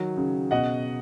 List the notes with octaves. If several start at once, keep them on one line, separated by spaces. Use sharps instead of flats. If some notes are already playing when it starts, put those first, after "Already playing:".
Already playing: D#3 F#3
C#3
B2 D#5 F#5